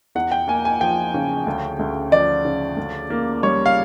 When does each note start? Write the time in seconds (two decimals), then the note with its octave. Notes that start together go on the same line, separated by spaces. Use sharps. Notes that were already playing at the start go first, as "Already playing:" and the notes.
0.15 E2 F#5
0.32 G5
0.48 A#3 G#5
0.65 G#5
0.81 F3 G5
1.14 C#3
1.47 D2
1.79 D2
2.12 F3 D5
2.45 C#3
2.77 D2
3.10 A#3
3.43 G3 C#5
3.66 F5